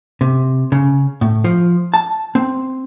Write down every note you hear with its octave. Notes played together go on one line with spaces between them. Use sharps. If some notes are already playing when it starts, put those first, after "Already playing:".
C3
C#3
A2
F3
A5
C4